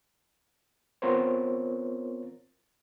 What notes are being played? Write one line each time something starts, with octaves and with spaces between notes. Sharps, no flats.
B3 C4 F4 A#4 C5 C#5